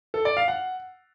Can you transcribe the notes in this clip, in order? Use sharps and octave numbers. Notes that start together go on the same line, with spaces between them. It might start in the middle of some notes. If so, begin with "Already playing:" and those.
A4
D5
F5
F#5